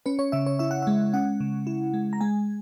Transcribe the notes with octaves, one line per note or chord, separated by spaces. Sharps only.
C#4 B4
C#5
C#3 E5
C#5
E4 E5
F#5
E5
G#3
C#4 F#5
C#3
E4
G#3
A#5
G#3 G#5